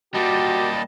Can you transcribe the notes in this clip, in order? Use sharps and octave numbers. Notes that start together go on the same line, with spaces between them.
A#2 G3 F#4 G4 D#5 A5